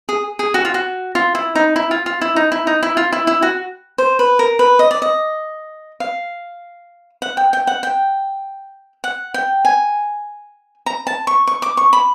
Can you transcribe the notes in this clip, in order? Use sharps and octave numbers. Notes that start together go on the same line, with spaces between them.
G#4
G#4
F#4
F4
F#4
F4
E4
D#4
E4
F4
F4
E4
D#4
E4
D#4
E4
F4
E4
E4
F#4
C5
B4
A#4
B4
D#5
D5
D#5
F5
F#5
G5
G5
F#5
G5
F#5
G5
G#5
A#5
A5
C#6
C#6
D6
C#6
B5